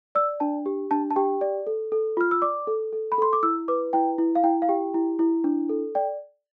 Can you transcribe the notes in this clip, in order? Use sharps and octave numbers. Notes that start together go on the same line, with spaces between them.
D5 E6
D4 A5
G4
D4 A5
A5
G4 G5
D5
A4
A4
F4 F6
E6
D5 D6
A4
A4
B5
A4 C6
D6
E4 E6
B4 D6
E4 G5
E4
F5
E4 G5
F5
G4 G5
E4
E4
D4
A4
D5 G5